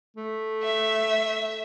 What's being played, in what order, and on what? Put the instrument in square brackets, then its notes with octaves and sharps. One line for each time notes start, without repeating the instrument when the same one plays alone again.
[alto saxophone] A3
[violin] E5